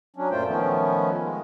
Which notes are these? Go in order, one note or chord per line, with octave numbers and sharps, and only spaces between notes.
F#3 C#4 D4
F#2 A#2 A3 F4 C5 G5
D#3 F3 A3 B3 C#4
G#3